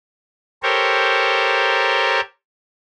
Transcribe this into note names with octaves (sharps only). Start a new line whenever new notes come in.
G4 A4 A#4 C5 C#5